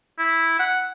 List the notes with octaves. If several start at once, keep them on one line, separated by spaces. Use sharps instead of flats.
E4
F#5